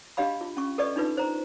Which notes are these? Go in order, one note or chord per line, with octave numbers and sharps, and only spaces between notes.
D4 G4 D#5 F5 B5
F4
C#4 C#6
A4 B4 D5 D#5 C#6
D4 D#4 F4 B4
C5 A#5